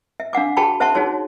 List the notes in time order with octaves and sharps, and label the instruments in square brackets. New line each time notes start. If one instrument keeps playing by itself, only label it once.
[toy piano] E5
D4 F5 F#5 D6
F#4 G#4 G5 A5 B5 C#6
C5 E5 F#5 A5 C6 C#6
D#4 F#4 G#4 C#5 C6